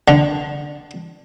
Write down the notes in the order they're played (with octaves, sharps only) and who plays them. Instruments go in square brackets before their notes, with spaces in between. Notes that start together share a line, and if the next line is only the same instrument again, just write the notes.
[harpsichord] D3